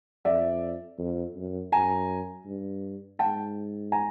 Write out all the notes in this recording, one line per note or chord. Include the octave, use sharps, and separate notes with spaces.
F2 D5 E5
F2
F#2
F#2 G#5 A#5
G2
G#2 G5 A5
G#5 A#5